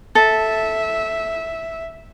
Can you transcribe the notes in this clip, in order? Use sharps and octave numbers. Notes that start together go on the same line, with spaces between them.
A4 E5